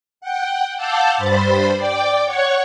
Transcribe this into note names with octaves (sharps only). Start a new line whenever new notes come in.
F#5 G5
F5 F#5 A5 D6 E6 G6
G2 C5 B5 A6
D5 G5 D6
C#5 F#5 C#6 G#6